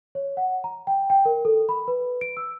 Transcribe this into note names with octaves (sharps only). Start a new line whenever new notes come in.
C#5
F#5
A#5
G5
G5
A#4
A4
B5
B4
D7
E6